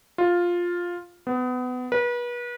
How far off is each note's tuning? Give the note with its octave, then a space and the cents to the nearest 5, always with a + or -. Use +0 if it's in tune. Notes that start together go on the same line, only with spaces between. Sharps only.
F4 +5
B3 +25
B4 -35